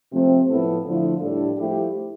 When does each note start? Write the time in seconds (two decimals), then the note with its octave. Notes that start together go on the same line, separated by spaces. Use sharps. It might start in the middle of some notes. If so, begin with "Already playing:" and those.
0.12 C3 F3 A3 C4
0.49 A2 F3 B3 E4 A4
0.85 D3 F3 A3 E4
1.21 A2 G3 D4 A4
1.58 F3 A3 E4 G4